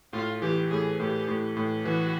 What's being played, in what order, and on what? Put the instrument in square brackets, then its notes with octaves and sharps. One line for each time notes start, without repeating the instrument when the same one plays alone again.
[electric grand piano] A2 [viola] F4
[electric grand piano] E3 [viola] G4
[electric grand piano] A2 [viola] G#4
[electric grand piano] A2 [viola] G4
[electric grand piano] A2
A2
[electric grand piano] E3 [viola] F#4